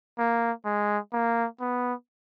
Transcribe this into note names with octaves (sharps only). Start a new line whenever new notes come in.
A#3
G#3
A#3
B3